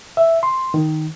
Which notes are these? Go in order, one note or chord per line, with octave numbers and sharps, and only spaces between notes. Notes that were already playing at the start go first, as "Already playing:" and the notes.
E5
C6
D#3